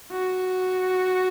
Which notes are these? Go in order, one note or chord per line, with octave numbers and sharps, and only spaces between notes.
F#4